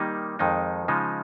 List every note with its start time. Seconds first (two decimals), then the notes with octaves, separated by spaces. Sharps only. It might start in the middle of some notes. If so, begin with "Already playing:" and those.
Already playing: D#3 G3 A#3 D#4
0.39 F2 D#3 G#3 D#4
0.88 C#3 F3 G#3 D#4